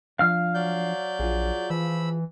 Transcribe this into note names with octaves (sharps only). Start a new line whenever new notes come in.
F3 D4 F5 F6
F#3 D5 G6
A#1 F4 G#4
E3 F3 B5 E6